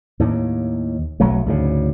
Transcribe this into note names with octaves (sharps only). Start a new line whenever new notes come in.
D#2 A2
B1 F#3 A3
D2 G#2 C#3